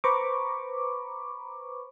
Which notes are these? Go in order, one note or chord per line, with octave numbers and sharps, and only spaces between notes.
B4 C5 A#5 B5 C#6 D6